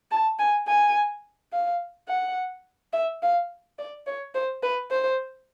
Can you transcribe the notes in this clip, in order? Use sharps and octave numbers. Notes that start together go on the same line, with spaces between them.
A5
G#5
G#5
F5
F#5
E5
F5
D5
C#5
C5
B4
C5